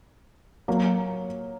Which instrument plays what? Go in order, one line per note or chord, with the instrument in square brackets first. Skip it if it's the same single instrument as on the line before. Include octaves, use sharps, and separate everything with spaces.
[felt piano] F#3 A#3